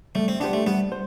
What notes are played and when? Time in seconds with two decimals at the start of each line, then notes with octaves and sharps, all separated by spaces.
0.15 G3 A3
0.28 C4
0.40 B3 D4 G4 C5
0.53 A3
0.67 G3 B3
0.92 C5